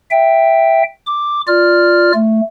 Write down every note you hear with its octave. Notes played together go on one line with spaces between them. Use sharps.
E5 G5
D6
F4 D5 F6
A3